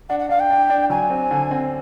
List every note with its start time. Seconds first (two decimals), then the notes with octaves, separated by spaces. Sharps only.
0.09 D4 F#5
0.19 F#5
0.29 D4 F5
0.40 G5
0.50 D4
0.70 D4
0.90 F#3 G#5
1.10 C4
1.31 D3
1.51 C4